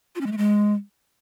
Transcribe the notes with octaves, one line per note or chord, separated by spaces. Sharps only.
F4
C#4
G#3
A3
G#3